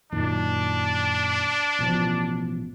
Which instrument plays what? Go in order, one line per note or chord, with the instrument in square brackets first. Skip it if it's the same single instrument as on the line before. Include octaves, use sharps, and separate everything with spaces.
[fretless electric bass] F#2 A#2 D#3 [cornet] D4
[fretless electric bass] A1 B2 F3